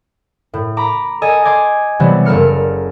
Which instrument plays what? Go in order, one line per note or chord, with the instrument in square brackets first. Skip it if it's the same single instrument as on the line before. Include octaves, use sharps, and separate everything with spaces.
[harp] A2
A#5 B5 D6
A4 D#5 G#5 E6
D#5 C6 D6 G#6
C3 E3 F#3 G3 B3
F#1 A4 A#4 F6 C#7